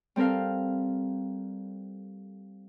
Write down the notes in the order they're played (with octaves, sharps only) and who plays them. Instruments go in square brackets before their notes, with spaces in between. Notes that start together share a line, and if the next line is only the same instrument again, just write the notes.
[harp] G3 C4 A4 A#4 F5